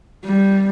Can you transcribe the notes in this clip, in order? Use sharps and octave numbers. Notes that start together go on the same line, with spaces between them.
G3